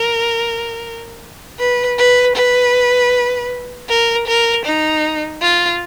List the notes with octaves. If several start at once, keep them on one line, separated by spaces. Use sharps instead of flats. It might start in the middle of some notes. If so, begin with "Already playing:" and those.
Already playing: A#4
B4
B4
B4
A#4
A#4
D#4
F4